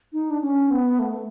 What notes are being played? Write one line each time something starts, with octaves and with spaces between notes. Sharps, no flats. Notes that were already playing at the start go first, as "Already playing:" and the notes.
D#4
D4
C#4
B3
A3